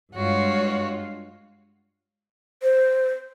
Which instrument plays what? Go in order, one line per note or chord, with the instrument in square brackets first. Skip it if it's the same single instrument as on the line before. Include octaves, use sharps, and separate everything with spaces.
[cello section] G2 G#3 F4 [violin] F#4 C#5
[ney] C5